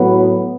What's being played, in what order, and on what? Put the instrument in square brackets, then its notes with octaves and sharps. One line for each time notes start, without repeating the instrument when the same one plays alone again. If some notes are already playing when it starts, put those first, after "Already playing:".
Already playing: [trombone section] A2 F#3 B3